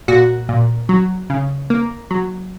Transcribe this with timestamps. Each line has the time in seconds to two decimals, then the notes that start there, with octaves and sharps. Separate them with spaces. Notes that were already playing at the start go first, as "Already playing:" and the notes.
0.08 A#2 F#4
0.49 A#2
0.89 F#3
1.30 C#3
1.70 A#3
2.11 F#3